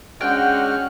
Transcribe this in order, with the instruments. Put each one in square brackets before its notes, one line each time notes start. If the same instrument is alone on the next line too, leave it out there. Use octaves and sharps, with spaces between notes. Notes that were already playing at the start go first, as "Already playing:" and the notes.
[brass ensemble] G#3 D4 F#5 [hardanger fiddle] C#4 [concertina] F#4 F6 F#6 [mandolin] G5